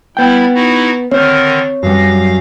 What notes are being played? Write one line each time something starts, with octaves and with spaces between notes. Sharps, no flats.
G3 B3 E4 G5
D#4 E4 F#4
D3 D#3 C4 A#4 C5 C#5
F#2 G3 F5 A#6